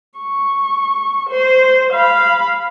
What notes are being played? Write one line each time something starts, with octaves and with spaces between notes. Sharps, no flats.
C#6
C5
F5 B5